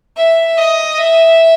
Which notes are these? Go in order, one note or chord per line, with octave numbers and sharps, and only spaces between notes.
E5
D#5
E5